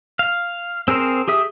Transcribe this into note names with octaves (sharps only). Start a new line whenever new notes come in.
F5
C4 G#4 A#4 C5
G4 G#4 E5 D#6